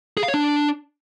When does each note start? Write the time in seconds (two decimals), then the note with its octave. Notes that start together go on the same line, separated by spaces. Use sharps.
0.17 G#4
0.23 F5
0.28 C#5
0.34 D4